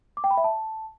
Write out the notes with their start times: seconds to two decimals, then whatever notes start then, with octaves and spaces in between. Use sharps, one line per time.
0.17 D6
0.24 G5
0.31 B5
0.37 E5
0.44 A5